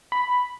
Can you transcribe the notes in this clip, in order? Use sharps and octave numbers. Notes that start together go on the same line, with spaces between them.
B5